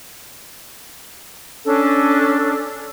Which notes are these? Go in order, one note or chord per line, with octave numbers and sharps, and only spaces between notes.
C#4 D4 A4